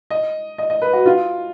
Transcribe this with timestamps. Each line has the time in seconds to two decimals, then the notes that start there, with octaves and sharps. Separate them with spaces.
0.10 D#5
0.58 D#5
0.70 D#5
0.82 B4
0.93 F#4
1.06 F4